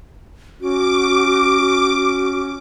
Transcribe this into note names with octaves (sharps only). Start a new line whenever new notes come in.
C#4 F#4 D6